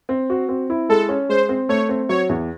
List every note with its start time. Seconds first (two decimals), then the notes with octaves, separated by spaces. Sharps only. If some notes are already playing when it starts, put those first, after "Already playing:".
0.09 C4
0.30 F#4
0.49 C4
0.70 E4
0.89 G#3 A4
1.09 C#4
1.29 G#3 C5
1.49 C4
1.69 A3 C#5
1.89 C4
2.09 F#3 C#5
2.29 E2